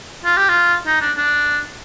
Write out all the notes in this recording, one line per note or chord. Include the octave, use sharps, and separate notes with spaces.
F4
G4
F4
D#4
D4
D4